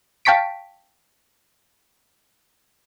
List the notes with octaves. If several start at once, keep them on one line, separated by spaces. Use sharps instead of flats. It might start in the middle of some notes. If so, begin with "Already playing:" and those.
F5 G5 A5 C#6 B6 D7